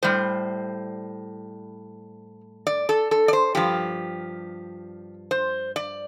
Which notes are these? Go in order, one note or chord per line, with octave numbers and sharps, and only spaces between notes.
A2 G3 C5
D5
A4
A4
D5
C5
G2 F3 G4
C5
D5